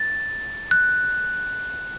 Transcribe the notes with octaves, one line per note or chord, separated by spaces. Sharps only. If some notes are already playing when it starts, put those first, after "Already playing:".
Already playing: A6
F#6